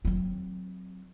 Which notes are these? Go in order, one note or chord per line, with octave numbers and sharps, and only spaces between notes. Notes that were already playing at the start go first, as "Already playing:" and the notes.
F#3 C4